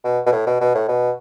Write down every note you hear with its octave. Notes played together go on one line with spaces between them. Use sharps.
B2
B2
A2
B2
B2
A2
B2